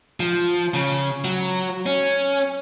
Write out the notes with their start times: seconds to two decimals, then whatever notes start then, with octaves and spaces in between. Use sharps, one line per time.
0.20 F3
0.74 C#3
1.25 F#3
1.86 C#4